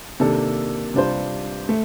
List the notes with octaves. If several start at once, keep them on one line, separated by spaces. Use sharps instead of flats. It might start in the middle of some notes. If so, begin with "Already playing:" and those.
C3 D#3 A#3 D4 A4
C3 G3 D4 F4 C5
A3